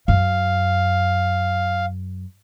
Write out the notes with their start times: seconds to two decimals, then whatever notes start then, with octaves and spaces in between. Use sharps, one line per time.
0.08 F#2 F5